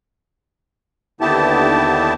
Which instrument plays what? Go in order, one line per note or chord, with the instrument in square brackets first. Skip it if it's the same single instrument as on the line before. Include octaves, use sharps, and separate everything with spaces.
[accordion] D#2 D3 B3 E4 G4 A5